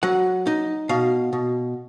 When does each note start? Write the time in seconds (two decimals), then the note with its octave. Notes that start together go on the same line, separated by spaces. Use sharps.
0.03 F#3 F#5
0.47 D#4
0.89 B2 F5
1.33 B2